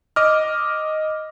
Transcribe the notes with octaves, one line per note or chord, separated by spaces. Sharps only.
D#5 D6 F6